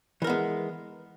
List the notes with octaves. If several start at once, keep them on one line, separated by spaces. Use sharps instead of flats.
E3 G#3 B3 A#4